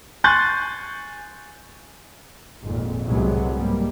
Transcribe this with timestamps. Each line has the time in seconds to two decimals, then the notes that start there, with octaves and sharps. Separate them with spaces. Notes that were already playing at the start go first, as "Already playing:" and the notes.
0.24 G#5 C6 C#6 F#6 G6 A6
2.62 G#1 F2 A#2
3.07 C2 A2 C3 F#3 G#3 B3
3.54 G#2 G3 A#3